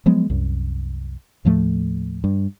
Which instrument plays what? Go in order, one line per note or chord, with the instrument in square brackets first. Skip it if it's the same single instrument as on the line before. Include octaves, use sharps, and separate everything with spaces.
[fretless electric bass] F3 F#3 G#3 B3
C2 F#2
D#2 A2 F3 A3
G2